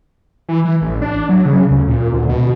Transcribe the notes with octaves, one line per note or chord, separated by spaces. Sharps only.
E3
E3
A1
D4
F#3
C#3
D2
A#2
D2
B2